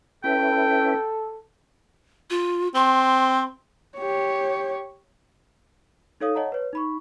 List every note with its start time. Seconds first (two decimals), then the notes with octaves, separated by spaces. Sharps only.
0.24 C#4 E4 A4 B4 G5
2.30 F4
2.75 C4 C6
3.98 G4 C#5
6.21 D#4 A4 C#5 F5 D#6
6.35 C#5 D#5 F#5 A5 A#5
6.52 B4 C#5
6.73 D#4 B5 C#6